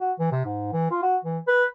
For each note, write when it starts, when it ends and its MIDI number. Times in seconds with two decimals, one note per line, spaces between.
0.01 0.12 66
0.19 0.31 52
0.32 0.42 48
0.45 0.72 44
0.73 0.90 52
0.91 1.01 65
1.02 1.17 66
1.25 1.39 52
1.47 1.65 71